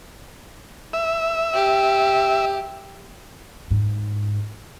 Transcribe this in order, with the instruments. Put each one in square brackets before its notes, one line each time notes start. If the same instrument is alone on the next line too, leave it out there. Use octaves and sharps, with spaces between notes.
[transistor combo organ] E5
[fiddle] G4
[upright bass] G#2